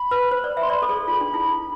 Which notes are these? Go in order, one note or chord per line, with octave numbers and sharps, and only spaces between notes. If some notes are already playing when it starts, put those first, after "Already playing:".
Already playing: B5
B4
C5
D5
E5
C6
D5 B5
A4
G#4
F4 B5
D4
E4